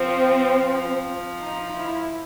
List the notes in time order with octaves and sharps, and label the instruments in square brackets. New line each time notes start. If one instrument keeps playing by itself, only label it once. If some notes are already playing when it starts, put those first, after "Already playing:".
Already playing: [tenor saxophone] F3 [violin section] C4
[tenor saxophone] F3
[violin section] D#4
E4